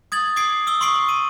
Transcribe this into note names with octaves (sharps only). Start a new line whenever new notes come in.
D#6 G#6 A6 F#7
D6 D#6 G#6 C7 D7
D#6 E6 G7
C6 C#6 D#6 C7 D7 F#7
D#7